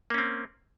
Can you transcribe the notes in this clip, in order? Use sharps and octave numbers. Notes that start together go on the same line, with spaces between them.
A#3 C4 C#4